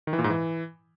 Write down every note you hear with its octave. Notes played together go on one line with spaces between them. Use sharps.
D#3
E3
A#2
G#2
E3